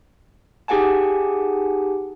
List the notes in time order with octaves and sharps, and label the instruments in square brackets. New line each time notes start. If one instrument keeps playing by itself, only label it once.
[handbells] D#4 G4 G#4 F#5 G#5 A5